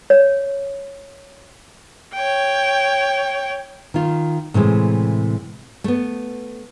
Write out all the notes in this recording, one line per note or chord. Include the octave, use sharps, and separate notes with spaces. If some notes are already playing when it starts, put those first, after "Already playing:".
C#5
C#5 G5
D#3 F4
A2 C3 E3 G#3
A3 B3